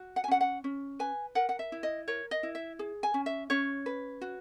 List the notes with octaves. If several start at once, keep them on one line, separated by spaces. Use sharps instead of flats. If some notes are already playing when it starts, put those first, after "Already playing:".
Already playing: F#4
F#5
G#5
C#4 F#5
F#5
C#4
B4 G#5
A#4 F#5
F#5
E5
E4
D#5
A#4 C#5
D#5
E4
E5
G#4
G#5
C#4
E5
C#4 C#5
B4
F#4